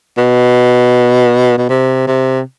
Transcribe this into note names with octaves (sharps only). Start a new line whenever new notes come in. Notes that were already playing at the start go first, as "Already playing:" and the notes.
B2
B2
C3
C3